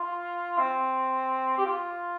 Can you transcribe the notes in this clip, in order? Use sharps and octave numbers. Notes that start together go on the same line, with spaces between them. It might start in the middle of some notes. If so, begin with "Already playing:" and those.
Already playing: F4
C4
G4
F4